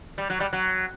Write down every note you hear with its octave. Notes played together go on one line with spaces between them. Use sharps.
G3
F#3
G3
F#3